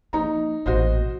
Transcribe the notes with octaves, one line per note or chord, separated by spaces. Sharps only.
F3 A#3 D#4 A#5
A1 A#2 F#4 C5 D#5